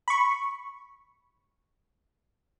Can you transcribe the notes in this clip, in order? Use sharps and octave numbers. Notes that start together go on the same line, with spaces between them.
B5 C#6